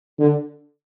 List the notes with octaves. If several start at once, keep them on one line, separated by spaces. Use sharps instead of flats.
D3